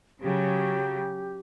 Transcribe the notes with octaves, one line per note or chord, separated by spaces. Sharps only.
C#3 F#3 G4